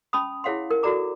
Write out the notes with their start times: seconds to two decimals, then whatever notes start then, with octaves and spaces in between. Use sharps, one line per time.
0.13 C#4 A5 B5 D#6
0.44 E4 G#4 C#5 F5 F#5 C6
0.70 D#4 A#4
0.83 F#4 A4 D5 A#5 D6